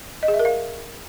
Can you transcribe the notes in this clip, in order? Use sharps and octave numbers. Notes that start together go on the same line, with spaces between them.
D#5
G#4
E5
A#4
F5